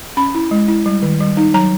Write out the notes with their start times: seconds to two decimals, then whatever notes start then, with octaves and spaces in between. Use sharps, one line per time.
0.17 C#4 B5
0.35 E4
0.51 G#3
0.68 E4
0.86 G3
1.03 D#3
1.20 G3
1.37 D#4
1.54 F#3 A#5